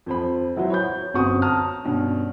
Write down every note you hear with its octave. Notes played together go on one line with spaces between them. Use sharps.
F2 C5 B5
F#3 E4 F#4 B4 C5
C#5 B5 G6
G1 F#2 C4 F#4 C#6 D#6
A5 A#5 D#6 F6
G2 B2 C#4